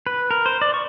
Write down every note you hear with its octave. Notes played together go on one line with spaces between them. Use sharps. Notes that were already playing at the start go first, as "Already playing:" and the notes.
B4
A#4
C5
D5
C#6